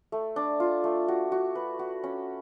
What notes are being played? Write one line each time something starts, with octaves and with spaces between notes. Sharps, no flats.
A3
D4
F4
A3
F#4
F#4
B4
F#4
C#4